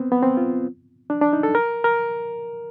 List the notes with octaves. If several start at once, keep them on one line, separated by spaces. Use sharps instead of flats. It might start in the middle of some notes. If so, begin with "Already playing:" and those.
Already playing: B3 C4
B3
C4
F4
D4
D4
D#4
A4
A#4
A#4